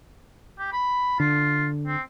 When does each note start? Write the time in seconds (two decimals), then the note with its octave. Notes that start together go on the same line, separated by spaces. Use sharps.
0.59 G4
0.73 B5
1.20 D3 F4
1.87 C4